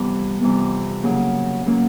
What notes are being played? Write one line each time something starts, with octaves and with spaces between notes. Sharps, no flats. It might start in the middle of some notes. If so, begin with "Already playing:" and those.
Already playing: F2 C3 E3 G3 B3
F2 C3 E3 G3 B3
C#3 F#3 A#3 C#4
C#3 F#3 A#3 C#4